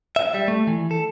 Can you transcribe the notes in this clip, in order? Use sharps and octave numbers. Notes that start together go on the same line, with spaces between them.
E5
G3
A3
E3
A4